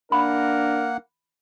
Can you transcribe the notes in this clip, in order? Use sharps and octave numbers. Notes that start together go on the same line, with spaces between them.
A#3 D4 A#4 F#5 B5